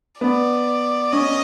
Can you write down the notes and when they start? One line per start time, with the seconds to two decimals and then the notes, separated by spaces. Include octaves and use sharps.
0.20 B3 D5
1.13 C#4 D#5